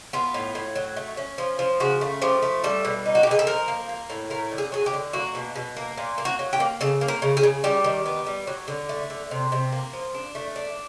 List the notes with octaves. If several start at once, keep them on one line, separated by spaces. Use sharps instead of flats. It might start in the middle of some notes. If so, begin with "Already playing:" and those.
B3 F4
A2
A2
F#3
A3
C#4
F3
F3
C#3 F#4
A3
F3 G4
A3
G3 A4
B2
D#4
F#4
G4
B2 G#4
A4
F3 A#4
A#3
A#3
A2
A3 A#4
D3
G#4
F#3 G#4
G4
D3
A#3 F#4
B2
B2
A#3
A#2
A#3
F#4
F#3
G4
A#3
C#3 A4
A#3
A#4
C#3
G#4
C#3
G3 G4
D#3
B3
G3
F#3
D3
A3
D3
C3
C3
A#3
F3
D4
A3
D4